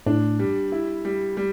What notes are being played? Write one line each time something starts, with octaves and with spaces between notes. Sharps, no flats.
A2 D4
G3
E4
G3
G3